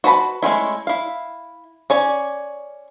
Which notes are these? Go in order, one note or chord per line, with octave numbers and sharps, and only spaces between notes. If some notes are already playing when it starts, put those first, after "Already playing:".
F#4 B4 A5 B5
G#3 A3 C#4 E4
E4 F5
C#4 C#5 D5